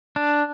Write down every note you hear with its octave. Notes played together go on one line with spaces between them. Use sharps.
D4